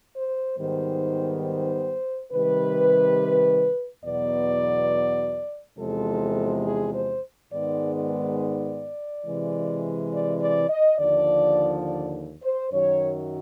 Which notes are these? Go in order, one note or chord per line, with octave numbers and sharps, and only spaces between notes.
C5
G#2 D#3 G3 B3 C5
C5
C3 D#3 G3 B4
E2 B2 F#3 B3 D5
E2 C3 F3 G#3 A4
G#4
C5
G#2 D#3 G#3 B3 D5
D5
D5
C3 E3 G#3
D5
D5
D#5
D#2 D3 F3 D5
D5
C5
F#2 D#3 F#3 C#5